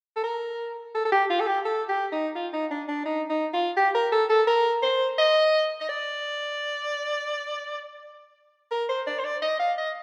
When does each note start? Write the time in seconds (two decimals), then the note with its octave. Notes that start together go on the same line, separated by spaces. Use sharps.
0.16 A4
0.23 A#4
0.95 A4
1.05 A4
1.12 G4
1.30 F4
1.40 A4
1.47 G4
1.65 A4
1.89 G4
2.12 D#4
2.35 F4
2.53 D#4
2.71 D4
2.88 D4
3.06 D#4
3.30 D#4
3.53 F4
3.77 G4
3.95 A#4
4.12 A4
4.30 A4
4.47 A#4
4.82 C5
5.18 D#5
5.81 D#5
5.89 D5
8.71 A#4
8.89 C5
9.07 D5
9.19 C5
9.24 D5
9.42 D#5
9.59 F5
9.78 D#5